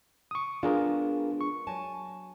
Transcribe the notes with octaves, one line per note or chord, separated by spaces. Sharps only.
C#6 D#6
G#3 B3 D4 F4 G#4 A#4
C#6
F#3 G#5 A5